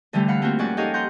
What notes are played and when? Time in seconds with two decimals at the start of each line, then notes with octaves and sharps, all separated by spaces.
0.13 D2 D3 E3 G3 A3
0.28 F5 F#5 B5
0.42 A3 A#3 C4 F4 F#4
0.59 F2 G#2 C#4 C#5 D5 F#5
0.77 D#4 G4 A4 C#5 D#5 F5
0.94 F#5 A#5 C6 G6